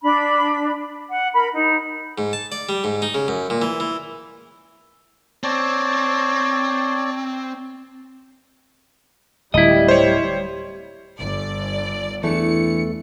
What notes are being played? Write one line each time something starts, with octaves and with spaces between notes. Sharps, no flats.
D4 B5
F#5
A#4 B5
D#4
G#2
A5
D5
G3
G#2
D#4
C#3
F#2
A#2
E3
E3
C4 C#5 D5 A5
D1 G3 E4 D#5
C5 C#5
G1 D5
E2 E3 A3 D4 C#7